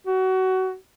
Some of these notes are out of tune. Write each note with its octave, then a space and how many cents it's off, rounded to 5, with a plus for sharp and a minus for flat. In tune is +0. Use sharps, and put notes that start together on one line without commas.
F#4 +25